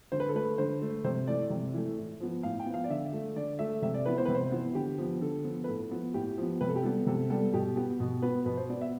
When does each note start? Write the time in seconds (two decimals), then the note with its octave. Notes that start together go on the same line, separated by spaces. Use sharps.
0.12 D3 C5
0.20 B4
0.28 A4
0.34 A3 B4
0.58 D3 C5
0.82 A3
1.04 C3 C5
1.27 E3 A3 D5
1.50 C3
1.74 E3 A3
1.97 A2
2.20 F3 B3
2.43 A2 F5
2.60 G5
2.66 F3 B3
2.74 F5
2.84 D5
2.90 D3 E5
3.13 A3
3.36 D3 D5
3.59 A3 E5
3.82 C3 E5
3.94 D5
4.06 E3 B3 B4
4.18 C5
4.25 C3 B4
4.35 C5
4.52 E3 B3
4.75 D3 G4
4.98 F3 B3
5.21 D3 A4
5.44 F3 B3
5.64 B4
5.68 A2 A4
5.90 F3 B3
6.14 A2 G4
6.38 F3 B3
6.61 C3 B4
6.69 A4
6.76 G4
6.83 G3 B3 A4
7.07 C3 A4
7.30 G3 B3 A4
7.54 B2 G4
7.76 B3 G4
8.00 B2
8.22 B3 B4
8.46 B2 B4
8.57 C5
8.69 B3 D5
8.81 E5